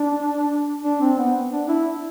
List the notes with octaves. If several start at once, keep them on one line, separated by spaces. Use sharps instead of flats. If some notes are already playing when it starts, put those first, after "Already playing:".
Already playing: D4
D4
C4
B3
D4
E4